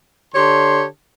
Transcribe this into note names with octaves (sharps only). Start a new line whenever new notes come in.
D3 G4 C#5 A5 C6